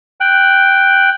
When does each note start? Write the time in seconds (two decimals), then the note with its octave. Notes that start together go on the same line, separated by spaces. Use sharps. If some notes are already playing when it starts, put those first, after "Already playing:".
0.20 G5 F#6